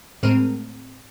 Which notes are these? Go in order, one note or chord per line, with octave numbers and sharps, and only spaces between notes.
A2 G#3 C4 A#4 F6 D#7